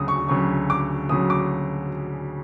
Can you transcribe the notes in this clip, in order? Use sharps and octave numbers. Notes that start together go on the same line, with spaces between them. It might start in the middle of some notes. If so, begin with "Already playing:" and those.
Already playing: D2 C#3 F#3 D#6
C#6
D2 C#3 F#3 C#6
D6
D2 C#3 F#3 D#6
D6